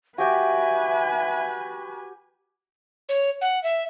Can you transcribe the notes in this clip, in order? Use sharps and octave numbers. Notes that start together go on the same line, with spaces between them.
F#4 G4 B4 E5 G5 G#5
C#5
F#5
E5